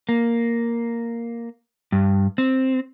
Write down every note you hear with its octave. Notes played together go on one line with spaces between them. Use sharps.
A#3
G2
C4